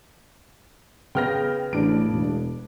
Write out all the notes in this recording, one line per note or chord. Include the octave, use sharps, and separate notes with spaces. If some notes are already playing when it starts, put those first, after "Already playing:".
C#3 B3 G5 F6 A#6
A1 D4 D7
E1